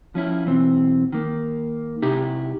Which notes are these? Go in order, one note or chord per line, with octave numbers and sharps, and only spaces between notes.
F3 C#4 E4
B1 E3 C4
D#3 A#3
C3 D#4 E4 G4